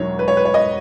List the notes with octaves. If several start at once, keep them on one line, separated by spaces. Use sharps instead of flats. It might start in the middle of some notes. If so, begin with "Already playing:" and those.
Already playing: E1 D#2 D#3 F#3 C#5
B4
C#5
B4
C#5
D#5